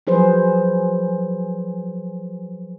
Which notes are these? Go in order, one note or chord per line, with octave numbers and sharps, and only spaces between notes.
F3 F#3 G#4 B4 C5